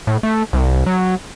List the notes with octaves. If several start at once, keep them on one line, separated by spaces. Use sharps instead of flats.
A2
A3
C2
F#3